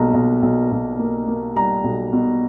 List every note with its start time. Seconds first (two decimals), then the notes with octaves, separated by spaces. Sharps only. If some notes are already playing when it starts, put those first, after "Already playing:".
Already playing: B1 B2 G3 A#3 A#5
0.14 B1
0.42 B1
0.71 B1
0.99 A#3
1.27 A#3
1.55 G3 A#5
1.84 B1
2.13 B2